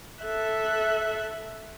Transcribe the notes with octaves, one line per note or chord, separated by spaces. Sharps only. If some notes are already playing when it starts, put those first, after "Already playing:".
A4 E5 F#6